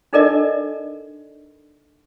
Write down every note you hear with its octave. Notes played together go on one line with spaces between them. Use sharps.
D4 D#4 A4 A#4 D5 D#5